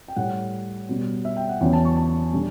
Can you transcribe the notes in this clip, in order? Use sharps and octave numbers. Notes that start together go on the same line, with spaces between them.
G5
A2 G3 F#5
B2 G3
E5
G5
F#5
E2 C#3 F#3 G5
A5
C#6
A5
D3 G3